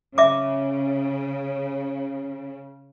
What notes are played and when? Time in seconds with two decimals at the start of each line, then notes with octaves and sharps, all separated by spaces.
0.18 C#3 E5 D6